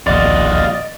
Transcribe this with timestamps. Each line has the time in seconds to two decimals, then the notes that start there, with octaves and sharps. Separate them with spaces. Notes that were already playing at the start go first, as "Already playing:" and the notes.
0.07 D1 A#1 D#2 F4 F#4 D5 D#5